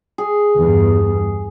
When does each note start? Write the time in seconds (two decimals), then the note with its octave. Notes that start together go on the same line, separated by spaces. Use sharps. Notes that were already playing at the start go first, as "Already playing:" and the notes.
0.18 G#4
0.55 E2 G2